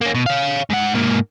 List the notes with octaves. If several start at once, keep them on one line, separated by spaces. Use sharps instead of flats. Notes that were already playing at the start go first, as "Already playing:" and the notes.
A#3 C#4
B2
C#5 F5
G#2 F#5
G#2 A#3